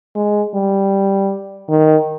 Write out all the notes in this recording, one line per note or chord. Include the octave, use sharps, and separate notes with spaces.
G#3
G3
D#3